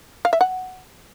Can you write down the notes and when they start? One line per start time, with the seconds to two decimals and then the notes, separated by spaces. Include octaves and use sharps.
0.25 F5
0.33 E5
0.41 F#5